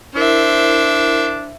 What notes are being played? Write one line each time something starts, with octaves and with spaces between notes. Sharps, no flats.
D4 E4 A#4 C5 E5